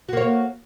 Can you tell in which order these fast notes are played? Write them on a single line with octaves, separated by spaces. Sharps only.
F#4 A#3 C#5